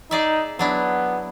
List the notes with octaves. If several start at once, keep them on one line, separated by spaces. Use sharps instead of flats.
D#4 G#4 D5 E5
F#3 B3 D4 E4